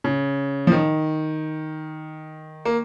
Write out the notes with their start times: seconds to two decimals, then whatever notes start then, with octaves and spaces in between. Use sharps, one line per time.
0.04 C#3
0.67 F3
0.72 D#3
2.65 A#3